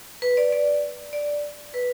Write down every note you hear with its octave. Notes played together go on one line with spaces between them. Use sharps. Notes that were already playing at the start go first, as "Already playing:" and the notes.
B4
D5
D5
D5
B4